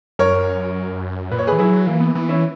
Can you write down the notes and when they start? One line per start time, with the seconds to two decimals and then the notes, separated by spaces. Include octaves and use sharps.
0.19 F#2 A#4 C#5
1.31 A#2 B4
1.39 C#5
1.47 G#4 B4
1.52 E3
1.58 F#3 E4 G#4
1.87 E3 A#3
2.00 B3
2.15 E3 B3
2.29 C#4 E4